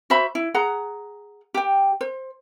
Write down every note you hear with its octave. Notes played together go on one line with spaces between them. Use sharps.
F#4 C5 E5 B5
E4
G#4 F#5 A#5
G4 G5
C5